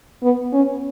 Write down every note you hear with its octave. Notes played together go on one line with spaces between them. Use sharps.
B3
C#4